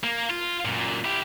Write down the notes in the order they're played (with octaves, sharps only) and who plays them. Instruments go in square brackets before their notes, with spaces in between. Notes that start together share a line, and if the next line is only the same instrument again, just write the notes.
[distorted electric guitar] A#3
F4
F#2 A#2
E4 G4